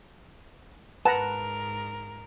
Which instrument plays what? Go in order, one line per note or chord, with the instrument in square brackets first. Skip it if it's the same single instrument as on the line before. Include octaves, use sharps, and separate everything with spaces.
[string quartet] G#2 A#4 [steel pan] B4 F#5 A#5 [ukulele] A5